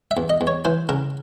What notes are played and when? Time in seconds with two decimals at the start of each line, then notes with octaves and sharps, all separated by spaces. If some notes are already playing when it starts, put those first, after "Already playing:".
0.11 E5
0.17 E2
0.30 D#5
0.41 E2
0.47 C#5
0.65 E3 C5
0.89 C#3 A#4